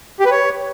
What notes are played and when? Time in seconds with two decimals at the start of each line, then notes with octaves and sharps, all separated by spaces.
0.20 G4
0.25 B4
0.31 C#5